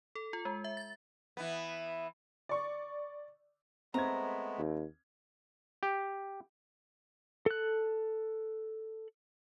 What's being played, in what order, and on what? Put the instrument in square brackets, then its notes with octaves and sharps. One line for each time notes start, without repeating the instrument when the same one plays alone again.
[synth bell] A4
F4
G#3
E5
A6
[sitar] E3 B3
[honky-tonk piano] D5 C#6
[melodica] G#3 A3 B3 [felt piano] C4 G#6 [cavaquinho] A#5
[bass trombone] D#2
[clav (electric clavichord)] G4
[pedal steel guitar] A4 F#6